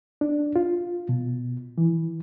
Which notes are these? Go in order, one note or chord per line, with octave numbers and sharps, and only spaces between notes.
D4
F4
B2
E3